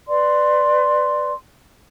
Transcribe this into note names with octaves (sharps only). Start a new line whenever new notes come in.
B4 D5 C6